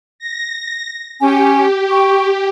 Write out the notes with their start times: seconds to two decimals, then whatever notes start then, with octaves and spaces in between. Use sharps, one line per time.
0.19 A#6
1.20 C#4 G4 G#5
1.90 G5 C#6